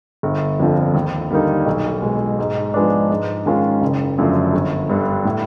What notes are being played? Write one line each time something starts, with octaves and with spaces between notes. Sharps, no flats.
G1
F2 D3 F3
D#2
D3 G3 A#3 D#4
B1
B2 G#3
G#2
F3 G#3 B3 D4
G#2
D#3 G#3 C#4 F4
F#1
F#2 D3 F3 A3
G1
G2 D3 G3
A2